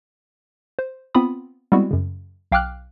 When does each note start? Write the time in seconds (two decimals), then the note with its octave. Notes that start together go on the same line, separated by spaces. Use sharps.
0.79 C5
1.15 B3 C4 F4 B5 D#6
1.72 G3 G#3 B3 C4 E4 F#4
1.91 F#2 C#3
2.52 B1 F5 G5 D6 F6 F#6